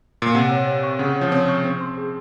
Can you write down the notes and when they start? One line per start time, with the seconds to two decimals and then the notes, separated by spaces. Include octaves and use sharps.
0.22 A#2
0.34 C3 F#5
0.51 C#5
0.67 C#5
0.83 C#6
0.99 C#3 F#5
1.16 C#5
1.21 F3
1.32 C4 C#5
1.49 C#6
1.65 C4 C5
1.81 C6
1.97 G#4